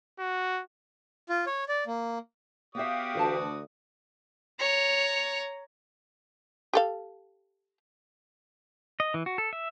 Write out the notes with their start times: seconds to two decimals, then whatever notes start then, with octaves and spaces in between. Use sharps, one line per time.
0.19 F#4
1.29 F4
1.47 C#5
1.68 D5
1.87 A#3
2.75 B3 F#4 G4 D5 E5 F5 D#6
3.15 D2 E3 B4 A5
4.59 C#5 A#5
6.73 G4 A4 F5
9.00 D#5
9.14 E3
9.26 F#4
9.38 A4
9.53 E5